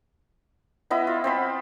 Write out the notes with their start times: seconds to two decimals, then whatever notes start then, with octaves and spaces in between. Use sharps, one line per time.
0.90 B3 E4 D#5 B5
1.07 F4
1.24 C4 C5 B5